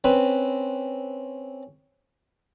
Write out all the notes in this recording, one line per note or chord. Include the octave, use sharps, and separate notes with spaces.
C4 C#4 B4